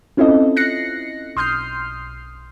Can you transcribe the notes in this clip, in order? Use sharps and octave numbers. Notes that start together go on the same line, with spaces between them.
C4 C#4 E4 F4 A4 D#5
F#6 A#6 C7 C#7
B1 C6 D#6 F6 G6 C7